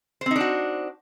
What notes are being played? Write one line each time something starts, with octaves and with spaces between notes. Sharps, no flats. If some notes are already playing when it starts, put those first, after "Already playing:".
C4 D4 D#4 F#4 C5